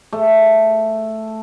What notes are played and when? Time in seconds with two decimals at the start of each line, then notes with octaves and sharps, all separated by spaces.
0.13 A3